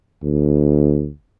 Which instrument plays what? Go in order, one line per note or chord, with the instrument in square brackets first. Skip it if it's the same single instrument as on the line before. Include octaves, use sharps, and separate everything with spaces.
[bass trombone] D2